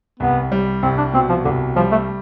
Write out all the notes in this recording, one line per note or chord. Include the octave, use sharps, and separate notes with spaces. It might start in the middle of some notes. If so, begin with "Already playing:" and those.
C2 B3
G3
C2 C4
D4
B2 C4
F3
C2 D3
F3 G3
A3